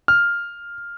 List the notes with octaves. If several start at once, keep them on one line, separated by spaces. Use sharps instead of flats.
F6